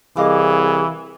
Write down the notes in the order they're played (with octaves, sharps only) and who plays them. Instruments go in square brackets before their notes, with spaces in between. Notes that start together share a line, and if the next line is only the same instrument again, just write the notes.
[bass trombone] C2 [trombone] E3 [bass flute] G#4 [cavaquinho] D#5 F5 D6